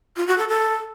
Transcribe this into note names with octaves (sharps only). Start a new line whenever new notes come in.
F4
F#4
A4
A4